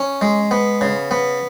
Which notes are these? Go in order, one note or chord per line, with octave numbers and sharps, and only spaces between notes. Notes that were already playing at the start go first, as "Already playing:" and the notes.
Already playing: C#4
G#3
B3
C#3
B3